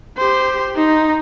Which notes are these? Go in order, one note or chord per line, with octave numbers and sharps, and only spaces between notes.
G4 C5
D#4